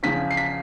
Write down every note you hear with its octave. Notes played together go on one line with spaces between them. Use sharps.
E2 C#3 F3 B6
C7
B6